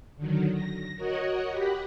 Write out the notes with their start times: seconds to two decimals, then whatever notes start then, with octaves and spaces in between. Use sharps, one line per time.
0.16 D3 D#3 F#3
0.51 A#6
0.95 F#4 A#4 C#5 D#5 F#5
1.49 G4 F#5 B5